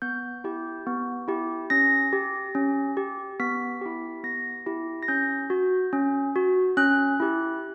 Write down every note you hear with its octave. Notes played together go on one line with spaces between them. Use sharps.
B3 G6
E4 G4
B3
E4 G4
C#4 A#6
G4
C#4
G4
B3 B6
E4 G4
B3 A#6
E4 G4
A#6
C#4 G6
F#4
C#4
F#4
C#4 F#6
E4 G4